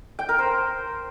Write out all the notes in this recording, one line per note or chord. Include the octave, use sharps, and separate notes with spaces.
G5
A#4
C5